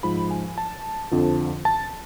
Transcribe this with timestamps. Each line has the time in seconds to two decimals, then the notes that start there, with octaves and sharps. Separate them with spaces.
0.03 G#2 F3 B5
0.31 G#5
0.58 A5
1.11 F2 D3 F3
1.65 A5